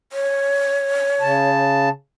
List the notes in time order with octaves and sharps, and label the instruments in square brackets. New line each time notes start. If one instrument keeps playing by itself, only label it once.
[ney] C#5
[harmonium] C#3 A5